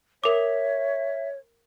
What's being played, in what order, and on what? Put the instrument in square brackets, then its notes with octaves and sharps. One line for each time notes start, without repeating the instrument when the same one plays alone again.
[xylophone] A#4 D6 [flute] C#5 [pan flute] E5